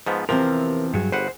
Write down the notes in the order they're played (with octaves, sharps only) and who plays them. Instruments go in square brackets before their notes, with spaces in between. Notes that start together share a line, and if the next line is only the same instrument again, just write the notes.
[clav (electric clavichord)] G#2 F3 B3
[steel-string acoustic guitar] E2 E3 C4 [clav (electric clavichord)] C3 F3 [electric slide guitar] A#4
[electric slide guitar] G2 F#3 [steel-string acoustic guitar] G#4
[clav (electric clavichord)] G1 B4 F#5 [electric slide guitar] C5